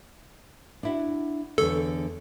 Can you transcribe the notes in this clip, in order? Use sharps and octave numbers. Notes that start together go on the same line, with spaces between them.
D4 E4 F#4
E2 D3 A4 C#5